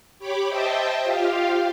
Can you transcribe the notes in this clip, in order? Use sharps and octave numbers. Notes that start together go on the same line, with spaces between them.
G4 C#5 B5 D6
C5 D#5 E5 G5 A5
F4 G4 F5